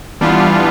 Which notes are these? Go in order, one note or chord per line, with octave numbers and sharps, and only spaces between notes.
E3 G3 B3 D4 F4